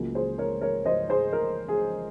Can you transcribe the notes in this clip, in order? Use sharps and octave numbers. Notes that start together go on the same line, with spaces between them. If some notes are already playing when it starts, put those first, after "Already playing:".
Already playing: C#2 C#3 F#3 A#3
G#4 C5
A#4 C#5
A#4 C#5
C5 D#5
G#4 C5
A#4
G#4